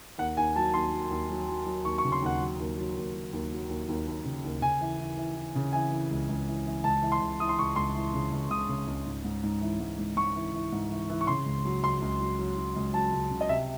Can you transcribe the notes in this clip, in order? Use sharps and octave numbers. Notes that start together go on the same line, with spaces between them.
D#2 F#5
D#2 G#5
F#3 A5
D#2 C6
F#3
D#2
F#3
F#3
F#3
D#2 C#6
C#6
C#3
C6
D#2 F#5
F#3
D#2
F#3
D#2
F#3
D#2
F#3
D#2
D#2
D#2
C#3
D#2
C#3 G#5
E3
E3
E3
E3
C#3
E3 G#5
E3
C#2
C#2
E3
E3
C#2 A5
E3
C6
C#2
E3 D#6
C6
C#2 C#6
C#2 C6
E3
C#3
C#2
C#2 D#6
C#3
C#2
G#2
G#2
G#2
E3
G#2
G#2
G#2 C#6
E3
E3
G#2
E3
E3
C#6
C#3 C6
C#2
F#3
C#2 C6
C#2
F#3
F#3
F#3
C#2
F#3 A5
C#2
C#3
D#5
C3 E5